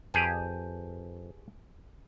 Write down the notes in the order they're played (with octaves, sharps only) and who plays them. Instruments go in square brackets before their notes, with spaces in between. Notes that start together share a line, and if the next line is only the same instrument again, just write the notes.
[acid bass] F2 [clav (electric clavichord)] G4 G#4 B4 [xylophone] G#5 A5 G6